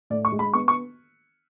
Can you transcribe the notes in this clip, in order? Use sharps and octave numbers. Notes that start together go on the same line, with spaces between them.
A2 D5
C#6
G#3
B5
B3 C#6
C#6